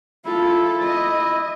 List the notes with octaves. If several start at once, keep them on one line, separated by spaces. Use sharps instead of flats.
E4 F4 A4
D#5